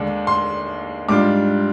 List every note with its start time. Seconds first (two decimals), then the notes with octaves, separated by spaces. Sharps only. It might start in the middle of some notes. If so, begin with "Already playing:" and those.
Already playing: D#2 D3 G#3 D4
0.27 C6
1.09 G#2 G3 D4 F4 D6